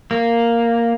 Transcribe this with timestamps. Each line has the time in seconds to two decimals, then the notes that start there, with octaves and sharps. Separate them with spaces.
0.11 A#3